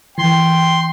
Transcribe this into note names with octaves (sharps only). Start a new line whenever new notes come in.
E3 G5 C6